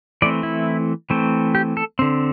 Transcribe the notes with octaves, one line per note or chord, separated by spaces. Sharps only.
E3 A3 C4 D5
E4
E3 A3 C4
G4
A4
D3 C4